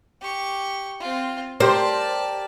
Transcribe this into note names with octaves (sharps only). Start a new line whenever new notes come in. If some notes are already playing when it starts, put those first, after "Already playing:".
G4 C#6
C4 F4
G4 A#4 C5 D5 A5